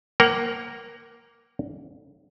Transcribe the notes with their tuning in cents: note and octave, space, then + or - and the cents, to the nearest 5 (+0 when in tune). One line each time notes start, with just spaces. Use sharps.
A#3 +0 A#4 +0 F#5 +40